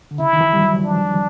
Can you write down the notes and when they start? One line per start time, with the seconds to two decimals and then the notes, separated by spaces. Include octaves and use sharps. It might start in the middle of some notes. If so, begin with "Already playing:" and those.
0.11 D3
0.19 C#3 E4
0.33 D#3
0.41 E3
0.53 G3
0.62 F#3
0.83 F3 D4